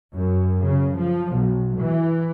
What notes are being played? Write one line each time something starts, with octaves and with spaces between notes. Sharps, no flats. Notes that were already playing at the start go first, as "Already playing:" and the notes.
F#2
C#3
F3
B1
E3